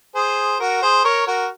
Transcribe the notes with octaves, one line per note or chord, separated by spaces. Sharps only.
G#4 C5
F#4 A#4
G#4 C5
A#4 C#5
F#4 A#4